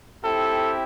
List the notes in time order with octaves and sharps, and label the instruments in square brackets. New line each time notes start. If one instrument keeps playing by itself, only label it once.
[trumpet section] C4 E4 G4 A4